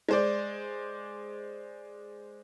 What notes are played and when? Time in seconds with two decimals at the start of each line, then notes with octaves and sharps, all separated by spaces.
0.09 G#3 C5 D5